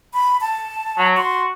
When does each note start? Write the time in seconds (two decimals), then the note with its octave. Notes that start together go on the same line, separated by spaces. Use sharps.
0.14 B5
0.41 A5
0.98 F#3
1.17 F#4 C6